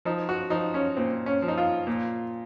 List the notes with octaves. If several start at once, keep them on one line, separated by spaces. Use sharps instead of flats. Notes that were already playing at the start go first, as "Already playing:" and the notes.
F3 D#4
F#4
F3 D#4
C#4
A#2 C4
C#4
F3
D#4
F4
A#2